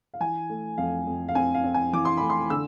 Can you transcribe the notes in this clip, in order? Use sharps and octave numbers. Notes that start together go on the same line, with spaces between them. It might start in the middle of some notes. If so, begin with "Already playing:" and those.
F5
E3 G#5
A3
F2 F5
F2
F5
C4 G#5
F5
C4
G#5
E3 D6
C6
A3 B5
C6
D3 E6